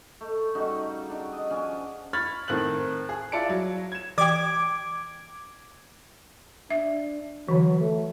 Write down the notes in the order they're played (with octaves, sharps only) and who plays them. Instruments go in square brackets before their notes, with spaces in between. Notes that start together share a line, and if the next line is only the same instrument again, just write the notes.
[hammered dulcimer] A3
C#3 G3 D#4 F#4
D4
D#5
F3 C#4 D4 G#5
[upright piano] B5 C#6 F6 G#6 A6
A2 D#3 C4 A4 F#6 F#7
G#4
E4 F4 D5 A5 C#7 D7
F#3
G#6 E7
[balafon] E3 G5 [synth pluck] D6 G#6
[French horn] D4 [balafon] E5
[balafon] D3 E3 [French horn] F#3
[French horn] A3